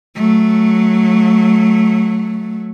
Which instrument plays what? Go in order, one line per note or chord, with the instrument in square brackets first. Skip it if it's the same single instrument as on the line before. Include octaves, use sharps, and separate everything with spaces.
[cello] F#3 A3